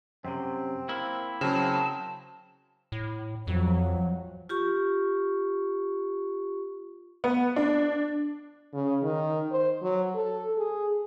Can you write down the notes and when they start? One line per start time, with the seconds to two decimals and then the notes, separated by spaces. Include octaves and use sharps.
0.25 F#2 C3 C4
0.89 A#3 E4
1.41 C#3 F#3 C4 A5
2.92 A2
3.47 F2 F3 F#3
4.49 F4 G4 C#6
7.24 B3
7.56 D4
8.74 C#3
9.03 D#3
9.52 C5
9.82 F#3
10.15 A4
10.57 G#4